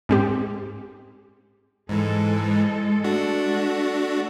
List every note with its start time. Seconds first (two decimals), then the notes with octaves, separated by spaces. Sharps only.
0.09 G#2 C4 G4
1.89 G#2 E3 G#3 A4
3.04 A3 D4 F#4